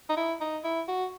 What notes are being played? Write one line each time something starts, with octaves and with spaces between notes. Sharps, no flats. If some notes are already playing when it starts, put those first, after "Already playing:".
D#4
E4
D#4
E4
F#4